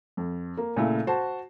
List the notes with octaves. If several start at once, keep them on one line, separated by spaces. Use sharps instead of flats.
F2
A#3
A#2 C#3 A3 E4
F#4 C5 A5